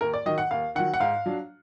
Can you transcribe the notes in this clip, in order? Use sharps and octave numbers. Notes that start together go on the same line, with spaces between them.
D#2 A#4
D5
D#3 F#3 D#5
F#5
D#2 F5
D#3 F#3 F#5
F#5
G#2 F5
F#3 D4